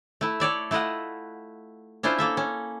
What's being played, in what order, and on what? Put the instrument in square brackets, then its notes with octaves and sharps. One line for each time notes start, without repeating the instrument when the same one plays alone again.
[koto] A3 E4
A4 C#5 D5 E5
A3 E4 F4 D#5 F#5
C#4 D4 E4 F4 C5
A#3 A4 E5
C#4